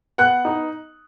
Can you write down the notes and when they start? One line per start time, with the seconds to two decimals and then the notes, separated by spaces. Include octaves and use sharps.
0.18 B3 F#5 F#6
0.45 D#4